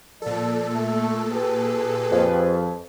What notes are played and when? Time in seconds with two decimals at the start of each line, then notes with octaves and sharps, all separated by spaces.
0.22 A#2 F3 A4 D5
0.73 A3
1.32 G4 G#4 B4
2.11 F2